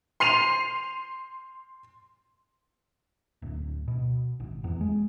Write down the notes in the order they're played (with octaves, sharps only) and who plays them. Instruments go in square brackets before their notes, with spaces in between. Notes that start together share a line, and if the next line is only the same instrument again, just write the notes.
[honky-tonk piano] C6 C7 D#7 F7
[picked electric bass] D1
B2
G#1
E2
G#3